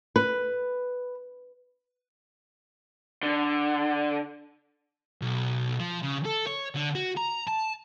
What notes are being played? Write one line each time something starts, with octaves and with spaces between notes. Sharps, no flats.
B4
D3
B1
F3
C#3
A4
C#5
D3
F#4
A#5
A5